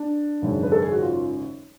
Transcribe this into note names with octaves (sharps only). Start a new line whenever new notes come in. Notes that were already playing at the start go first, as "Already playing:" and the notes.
Already playing: D4
G#1 F#2 C#3
B4
A4
G#4
F#4
F4